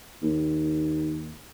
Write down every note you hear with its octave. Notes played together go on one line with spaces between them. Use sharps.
D#2